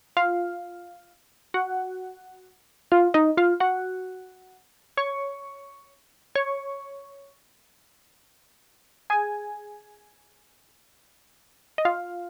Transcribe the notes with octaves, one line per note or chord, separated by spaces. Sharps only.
F4 F5
F#4 F#5
F4 F5
D#4 D#5
F4 F5
F#4 F#5
C#5 C#6
C#5 C#6
G#4 G#5
D#5
F4 F5